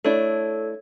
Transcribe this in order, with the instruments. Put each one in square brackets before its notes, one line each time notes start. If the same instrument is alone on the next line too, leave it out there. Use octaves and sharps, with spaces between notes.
[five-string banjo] A3 D4 E4 [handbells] A4 C#5